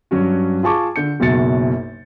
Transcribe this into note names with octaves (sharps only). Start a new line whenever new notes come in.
G2 F#3 C#4 F#4
F4 G#4 A5 C#6 D6
D3 G6 C#7
F#1 B1 F#2 F#4 A6 C#7